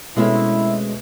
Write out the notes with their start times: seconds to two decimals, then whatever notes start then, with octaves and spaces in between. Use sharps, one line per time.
0.16 B2 G#3 A3 C4 C#4 E4